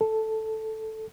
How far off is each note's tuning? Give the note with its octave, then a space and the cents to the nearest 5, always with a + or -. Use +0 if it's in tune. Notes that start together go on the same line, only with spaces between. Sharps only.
A4 +0